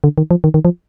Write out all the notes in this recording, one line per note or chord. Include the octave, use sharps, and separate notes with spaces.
D3
D#3
F3
D#3
D#3
F3